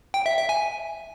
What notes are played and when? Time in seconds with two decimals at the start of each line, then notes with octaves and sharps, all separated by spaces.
0.14 G5
0.26 E5
0.37 E5
0.49 G#5